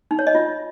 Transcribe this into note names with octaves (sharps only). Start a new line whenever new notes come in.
D#4
C#5
D#5
F4